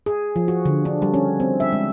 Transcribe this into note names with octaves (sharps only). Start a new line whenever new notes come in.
G#4
F3
F#4
D3
D4
G3
C#4
C4
E5
G#3